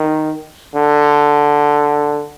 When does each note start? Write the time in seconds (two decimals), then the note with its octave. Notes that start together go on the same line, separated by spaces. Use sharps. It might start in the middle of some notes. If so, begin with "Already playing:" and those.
Already playing: D#3
0.75 D3